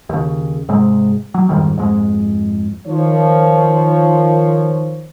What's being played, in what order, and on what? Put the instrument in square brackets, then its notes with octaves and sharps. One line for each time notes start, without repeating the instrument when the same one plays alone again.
[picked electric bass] D#2 C#3
G#2 C3 G#3
F#3
F2 G#2 D#3 G3
F2 G#2 G#3
[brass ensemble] D#3 F3 C#5